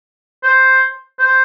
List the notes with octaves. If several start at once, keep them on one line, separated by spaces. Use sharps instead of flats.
C5
C5